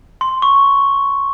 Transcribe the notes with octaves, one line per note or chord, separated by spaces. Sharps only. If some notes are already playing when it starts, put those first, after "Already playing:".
C6
C#6